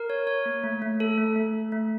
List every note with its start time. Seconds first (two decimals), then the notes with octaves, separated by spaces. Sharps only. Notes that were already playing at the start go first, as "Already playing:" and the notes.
Already playing: A#4
0.10 C#5
0.27 C#5
0.46 A#3
0.63 A3
0.82 A3
1.00 A4
1.18 A3
1.36 A3
1.54 A4
1.72 A3